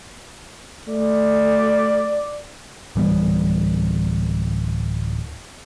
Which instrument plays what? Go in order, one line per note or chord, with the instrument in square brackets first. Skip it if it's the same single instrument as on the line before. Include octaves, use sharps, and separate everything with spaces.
[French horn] A3 [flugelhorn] D5
[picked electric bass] D1 E3 G3 B3